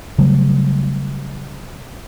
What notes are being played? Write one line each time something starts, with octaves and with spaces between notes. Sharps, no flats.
C#3 F#3 G3 A3